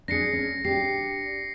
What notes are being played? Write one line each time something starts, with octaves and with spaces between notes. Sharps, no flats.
D4 G#4 A#6 C7 C#7
C#4
D4 G4 C7